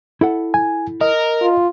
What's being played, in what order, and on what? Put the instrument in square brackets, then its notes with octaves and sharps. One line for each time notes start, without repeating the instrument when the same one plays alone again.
[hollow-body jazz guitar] E4 A4 F#5
[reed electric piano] G#5
[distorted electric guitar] A#4 [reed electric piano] D#5
[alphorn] F4